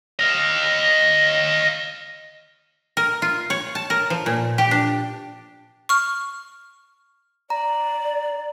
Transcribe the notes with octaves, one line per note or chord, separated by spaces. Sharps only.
D#5 F5
A#4
F4
C#5
A5
A#4
F3
A#2
G4
D4
C#6 F6
D5 A#5